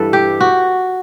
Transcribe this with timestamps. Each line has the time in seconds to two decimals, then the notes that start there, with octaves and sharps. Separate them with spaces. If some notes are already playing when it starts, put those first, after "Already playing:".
Already playing: G2 E3 G3 A4 B4
0.13 G4
0.40 F#4